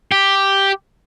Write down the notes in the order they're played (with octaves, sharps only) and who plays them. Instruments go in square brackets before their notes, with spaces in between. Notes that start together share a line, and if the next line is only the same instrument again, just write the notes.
[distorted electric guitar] G4